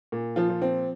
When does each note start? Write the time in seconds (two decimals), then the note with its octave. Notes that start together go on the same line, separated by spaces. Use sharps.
0.12 A#2
0.36 F3 F4
0.50 F3
0.62 C4